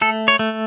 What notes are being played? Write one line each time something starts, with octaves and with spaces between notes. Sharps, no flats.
A3 A4
C#5
A3